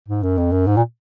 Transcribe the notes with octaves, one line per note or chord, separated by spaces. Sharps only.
G#2
F#2
F2
F#2
G#2
A#2